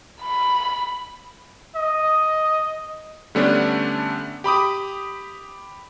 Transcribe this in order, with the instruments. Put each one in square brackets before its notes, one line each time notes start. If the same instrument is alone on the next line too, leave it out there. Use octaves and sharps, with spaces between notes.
[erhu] B5
[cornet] D#5
[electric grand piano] D3 G3 A3 B3 C#4 D4
G4 B5 D6 D#6